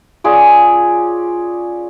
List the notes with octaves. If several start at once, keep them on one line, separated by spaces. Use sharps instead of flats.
C#4 F4 G#4 D5